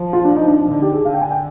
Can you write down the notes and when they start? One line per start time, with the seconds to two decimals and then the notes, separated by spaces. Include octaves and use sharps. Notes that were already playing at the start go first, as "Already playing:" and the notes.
Already playing: F3
0.13 F4
0.25 D4
0.36 D#4
0.47 D4
0.59 D4
0.70 D3 D#4
0.82 G4
0.93 G#4
1.05 D3 F5
1.14 G5
1.22 G#5
1.31 G5